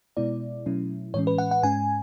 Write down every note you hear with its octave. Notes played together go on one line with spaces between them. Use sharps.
B2 G#3 B3 E4 D5
B2 F#3 A3 C#4 E4
A2 E3 G#3 C#4 C#5
B4
F#5
F#5
G#2 G#3 C#4 G#5